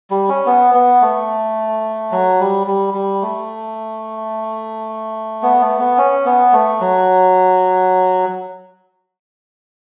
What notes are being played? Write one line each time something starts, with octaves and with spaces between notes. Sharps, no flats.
G3
C#4
B3
B3
A3
F#3
G3
G3
G3
A3
B3
A3
B3
C#4
B3
A3
F#3